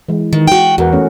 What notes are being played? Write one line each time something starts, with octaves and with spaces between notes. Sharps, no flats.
E3 G#3
D#3
F#4 G5
E2 F#4 A#4 F#5
E3 A3 C#4